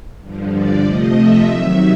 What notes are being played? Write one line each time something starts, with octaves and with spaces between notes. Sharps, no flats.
G2 D3 F3
D5
C3 F3 A3 D#5
E5
C3 D#3 F#3